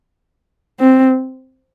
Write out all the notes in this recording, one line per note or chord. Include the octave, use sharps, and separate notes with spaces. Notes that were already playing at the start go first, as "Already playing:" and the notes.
C4